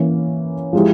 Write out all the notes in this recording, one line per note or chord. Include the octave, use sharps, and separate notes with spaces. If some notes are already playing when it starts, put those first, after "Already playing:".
Already playing: E3 A#3 C#4
F3 G#3 E4 G4